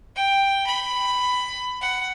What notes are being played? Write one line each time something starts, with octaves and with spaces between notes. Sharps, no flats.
G5
B5
F#5